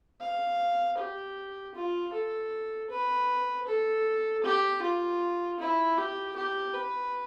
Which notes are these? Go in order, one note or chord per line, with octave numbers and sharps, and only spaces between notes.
F5
G4
F4
A4
B4
A4
G4
F4
E4
G4
G4
B4